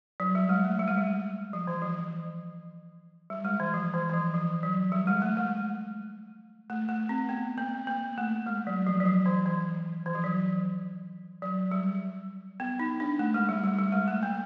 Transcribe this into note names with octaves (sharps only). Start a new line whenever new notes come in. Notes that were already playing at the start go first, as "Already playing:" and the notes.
F#3
G3
G#3
A3
G3
G#3
G3
F3
E3
F3
G3
G#3
E3
F3
E3
E3
F3
F3
F#3
G3
G#3
A3
G#3
A3
A3
C4
B3
A#3
A#3
A3
G#3
F#3
F3
F#3
F3
E3
E3
E3
F3
F#3
F#3
G3
B3
D#4
D4
A3
G#3
G3
G3
G3
G#3
A3
A#3